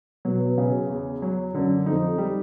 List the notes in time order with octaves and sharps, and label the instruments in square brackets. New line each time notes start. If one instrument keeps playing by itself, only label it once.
[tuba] B2 [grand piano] F#3
[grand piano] C#3
E2
F#3
[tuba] F#2 [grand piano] D3
[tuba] F2 [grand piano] D#4
[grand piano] G3